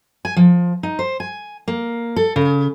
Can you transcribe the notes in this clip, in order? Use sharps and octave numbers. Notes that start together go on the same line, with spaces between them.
G#5
F3
D#4
C5
G#5
A#3
A4
C#3